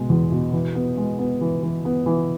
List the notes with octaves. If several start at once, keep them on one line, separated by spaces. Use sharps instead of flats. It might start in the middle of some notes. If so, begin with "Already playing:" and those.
Already playing: B2 G#3
E2
B2
E3
B3
G#3
B3
E3
E3
B3
E3